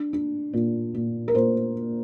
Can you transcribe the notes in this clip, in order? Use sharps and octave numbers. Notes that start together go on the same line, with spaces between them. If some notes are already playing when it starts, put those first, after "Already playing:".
Already playing: D4
D4
A#2
A#2
A#4
A#2 C5